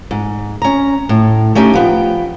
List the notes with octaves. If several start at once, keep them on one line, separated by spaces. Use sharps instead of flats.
G#2
C#4 A#5
A2
A3 C#4 D#4 G4
F3 B3 G5